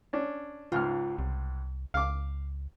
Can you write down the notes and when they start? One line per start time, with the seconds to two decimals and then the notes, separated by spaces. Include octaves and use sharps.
0.13 C#4 D4
0.72 C#2 G#2 F4 F6
1.19 C2
1.94 C#2 F5 D6